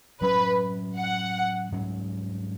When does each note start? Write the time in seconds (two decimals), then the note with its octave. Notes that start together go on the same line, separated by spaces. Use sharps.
0.21 A2 F#3 C#4 B4
0.97 F#5
1.72 G#2 F#3 C#4